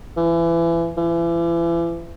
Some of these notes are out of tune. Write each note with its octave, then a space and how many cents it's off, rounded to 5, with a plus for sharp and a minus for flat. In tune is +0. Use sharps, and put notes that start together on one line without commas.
E3 +30
E3 +35